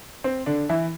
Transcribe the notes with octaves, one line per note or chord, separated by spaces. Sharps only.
C4
D3 D4
E3 E4